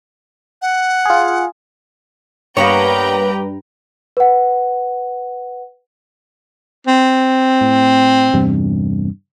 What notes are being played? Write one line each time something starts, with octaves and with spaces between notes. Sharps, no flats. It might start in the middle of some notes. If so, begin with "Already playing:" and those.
F#5
F4 G#4
G2 A#3 B3 G4 B4 C#5 G5 A#5
B4 F#5
C4
A2
E2 G2 C3